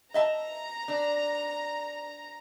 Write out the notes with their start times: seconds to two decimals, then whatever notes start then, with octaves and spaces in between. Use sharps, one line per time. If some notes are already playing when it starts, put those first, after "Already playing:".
0.14 D#5 E5 A5 A#5
0.88 D4